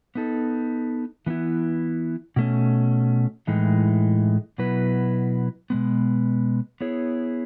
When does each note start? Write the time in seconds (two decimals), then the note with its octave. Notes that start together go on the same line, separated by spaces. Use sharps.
0.15 B3 D#4 A4
1.26 E3 B3 E4
2.36 B2 A3 C#4
3.47 A2 E3 G#3 D#4
4.58 B2 F#3 B3 E4 B4
5.70 B2 G#3 B3
6.81 B3 E4 G#4 C#5